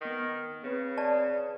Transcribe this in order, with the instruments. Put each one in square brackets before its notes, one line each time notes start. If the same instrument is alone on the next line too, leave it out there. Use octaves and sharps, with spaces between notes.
[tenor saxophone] D#3 [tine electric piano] B3 F6
[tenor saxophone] C#3 [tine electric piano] C4 B4
[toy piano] D5 A5